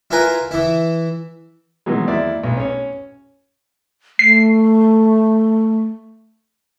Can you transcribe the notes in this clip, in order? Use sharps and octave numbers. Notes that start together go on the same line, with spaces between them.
E4 F4 A#4 B4 G#5 A#5
E3 E4
B2 D#3 E3 F#3 G#3
D#2 E4 D5
B1
C#4 C#5
A3 C7